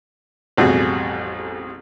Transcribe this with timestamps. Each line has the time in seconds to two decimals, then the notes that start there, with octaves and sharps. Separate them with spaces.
0.57 A1 F2 B2 G3 F#4 G#4